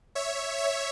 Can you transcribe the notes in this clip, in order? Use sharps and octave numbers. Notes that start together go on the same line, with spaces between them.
C#5 E5
C#5 E5